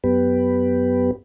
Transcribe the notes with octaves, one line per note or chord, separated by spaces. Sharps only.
F#2 B3 G4 B4